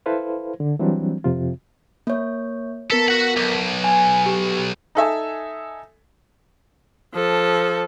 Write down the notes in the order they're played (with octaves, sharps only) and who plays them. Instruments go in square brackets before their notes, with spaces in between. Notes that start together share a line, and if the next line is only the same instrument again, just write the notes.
[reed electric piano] E4 A4 B4 C5 F5
D3
E3 F#3 G3 C4 D4
F2 C3 F4
[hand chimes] A#3 C#5
[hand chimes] B3 A#4 B6 [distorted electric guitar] A4
[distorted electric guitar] F#4 F#5
B1
[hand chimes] G#5
G4
[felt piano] D#4 A4 E5 G#5
[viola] F3 A4